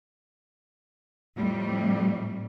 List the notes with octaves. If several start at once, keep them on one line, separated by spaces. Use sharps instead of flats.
F2 A2 G3